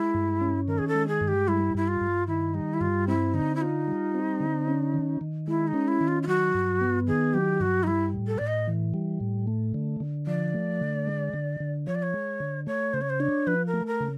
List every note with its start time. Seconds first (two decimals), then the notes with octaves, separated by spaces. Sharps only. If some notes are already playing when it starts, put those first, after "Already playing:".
Already playing: G#3 E4
0.14 G2
0.41 C#4
0.68 D#3 A#4
0.78 G#4
0.88 A4
0.95 G#3
1.08 G#4
1.21 G2
1.28 G4
1.48 G3 E4
1.75 G2 E4
1.88 F4
2.01 G2
2.28 D#3 E4
2.54 G3 D#4
2.74 E4
2.81 G2 F4
3.08 C4 E4
3.34 D3 D#4
3.55 E4
3.61 D#4 F4
3.87 G3
4.14 C4
4.40 D3
4.68 C#4
4.94 D#3
5.21 D#3
5.48 G#3 E4
5.67 D#4
5.74 C#4
5.88 E4
6.01 D#3
6.08 F4
6.23 F4
6.27 F#3 F#4
6.54 G2
6.81 B3
7.08 D#3 G#4
7.34 F#3 G4
7.60 G2 F#4
7.83 D#4
7.87 G3 E4
8.14 A2
8.27 A4
8.38 A2 D5
8.47 D#5
8.68 E3
8.94 G3
9.21 A2
9.47 A3
9.74 D3
10.00 D3
10.27 F3 D5
10.54 A3
10.81 D3
11.07 G#3
11.34 D3
11.60 D3
11.87 F3 C#5
11.95 D5
12.03 C#5
12.14 G#3
12.40 D3
12.67 A3 C#5
12.94 C#3 C5
13.01 C#5
13.10 C5
13.20 D4 C#5
13.47 F3 B4
13.67 A#4
13.74 A3
13.87 A#4
14.01 C#3